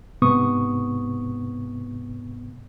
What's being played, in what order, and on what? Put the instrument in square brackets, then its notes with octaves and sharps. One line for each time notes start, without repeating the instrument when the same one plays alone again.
[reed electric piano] G#2 C3 B3 C#6 D#6